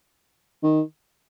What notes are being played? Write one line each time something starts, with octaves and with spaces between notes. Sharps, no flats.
D#3